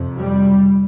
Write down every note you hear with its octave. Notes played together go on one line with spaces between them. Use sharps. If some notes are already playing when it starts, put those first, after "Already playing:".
Already playing: F2 C3
G3